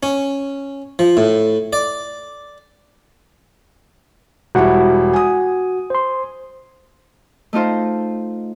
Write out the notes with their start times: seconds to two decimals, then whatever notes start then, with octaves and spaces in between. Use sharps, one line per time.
0.03 C#4
0.99 F3
1.17 A2
1.73 D5
4.55 E1 G3 E4 F#4 F#5
5.13 G#5 D#6
5.90 C5 C6
7.53 A3 D#4 F4 C5